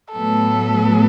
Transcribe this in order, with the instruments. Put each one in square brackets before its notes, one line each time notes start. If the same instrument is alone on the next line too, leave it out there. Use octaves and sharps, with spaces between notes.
[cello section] A2 F#3 B3 [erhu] A4